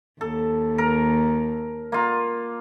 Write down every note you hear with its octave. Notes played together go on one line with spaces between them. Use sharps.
D#2 A4
A#4
A#3 F4